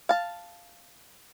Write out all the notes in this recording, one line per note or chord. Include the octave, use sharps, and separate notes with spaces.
F5 A5